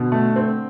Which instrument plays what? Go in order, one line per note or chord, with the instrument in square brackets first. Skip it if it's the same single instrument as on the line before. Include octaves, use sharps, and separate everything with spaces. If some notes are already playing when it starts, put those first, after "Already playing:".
Already playing: [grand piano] B2 [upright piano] D3
[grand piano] A3
C4